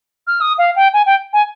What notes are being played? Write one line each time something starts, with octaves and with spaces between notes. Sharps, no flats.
F6
D#6
F5
G5
G#5
G5
G#5